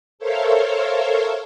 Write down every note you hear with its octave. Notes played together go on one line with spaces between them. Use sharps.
A4 A#4 C5 C#5 E5 F5